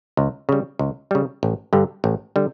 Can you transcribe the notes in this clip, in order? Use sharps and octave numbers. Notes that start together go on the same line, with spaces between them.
C#2
C#3 G3
C#2
C#3 G3
A1
G2 D3 G3
A1
D3 G3